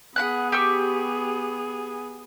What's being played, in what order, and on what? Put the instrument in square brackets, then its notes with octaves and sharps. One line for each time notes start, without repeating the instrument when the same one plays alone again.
[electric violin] B3 G#4 [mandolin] F#5 B5 F#6
[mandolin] G4 C#6 E6